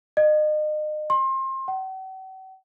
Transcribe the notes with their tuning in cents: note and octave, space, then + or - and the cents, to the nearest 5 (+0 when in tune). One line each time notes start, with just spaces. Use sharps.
D#5 -35
C6 +30
F#5 +45